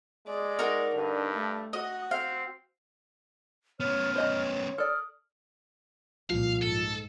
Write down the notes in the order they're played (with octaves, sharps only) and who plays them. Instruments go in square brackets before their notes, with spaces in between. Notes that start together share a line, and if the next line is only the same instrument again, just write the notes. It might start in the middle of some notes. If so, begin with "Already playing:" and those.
[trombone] G#3 [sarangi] D5
[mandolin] D#4 F#4 A#4
[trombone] G2 [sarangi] D3
[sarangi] A3
[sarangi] F#4 [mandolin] D#5
[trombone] C4 [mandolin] F5
[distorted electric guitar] B3 C#4 [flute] C#5 [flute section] F6
[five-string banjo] C5 D#5 A#5 [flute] C#5
[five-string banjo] A4 D5 [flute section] D#6 F6
[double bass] C2 A#2 [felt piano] F3 [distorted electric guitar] F5
[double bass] G#2 [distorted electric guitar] A4